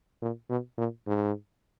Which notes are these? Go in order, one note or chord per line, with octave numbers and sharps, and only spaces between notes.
A#2
B2
A#2
G#2